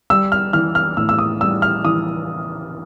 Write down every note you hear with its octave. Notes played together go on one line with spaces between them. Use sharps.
G3 E6
F6
E3 F6
F6
A2 E6
E6
D#6
G3 E6
F6
E3 D#6